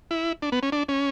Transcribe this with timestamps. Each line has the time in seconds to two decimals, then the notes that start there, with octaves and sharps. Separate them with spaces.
0.11 E4
0.42 D4
0.52 B3
0.63 C#4
0.72 D4
0.89 C#4